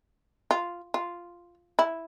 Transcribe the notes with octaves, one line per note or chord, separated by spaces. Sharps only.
F4
F4
E4